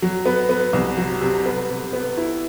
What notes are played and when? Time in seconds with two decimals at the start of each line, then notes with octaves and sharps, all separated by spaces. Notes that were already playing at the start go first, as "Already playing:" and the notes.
0.02 F#3
0.26 B3
0.49 B3
0.73 C2
0.97 F#3
1.21 C3
1.46 B3
1.70 C3
1.93 B3
2.17 E4